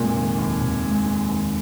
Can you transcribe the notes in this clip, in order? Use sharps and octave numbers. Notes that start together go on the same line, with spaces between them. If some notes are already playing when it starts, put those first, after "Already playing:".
Already playing: F1 A#2 G#3
D#3
D#2
F1
G#3
D#3
D#2